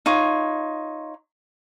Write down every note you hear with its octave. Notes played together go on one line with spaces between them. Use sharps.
D#4 F4 C#5